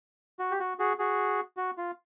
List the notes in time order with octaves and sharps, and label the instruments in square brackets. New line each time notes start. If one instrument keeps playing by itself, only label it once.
[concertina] F#4
G4
F#4
F#4 G#4
F#4 G#4
F#4
F4